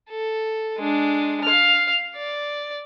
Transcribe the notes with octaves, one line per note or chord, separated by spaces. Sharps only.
A4
G#3 D4
F5 F6
D5